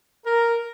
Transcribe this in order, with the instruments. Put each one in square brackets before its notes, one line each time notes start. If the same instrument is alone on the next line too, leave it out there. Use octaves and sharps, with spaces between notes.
[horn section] A#4